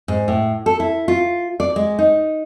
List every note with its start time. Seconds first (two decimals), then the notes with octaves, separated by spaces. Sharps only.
0.08 G#2
0.28 A2
0.66 A4
0.80 E4
1.08 F4
1.60 D5
1.76 G#3
1.99 D#4